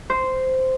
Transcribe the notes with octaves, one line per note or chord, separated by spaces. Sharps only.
C5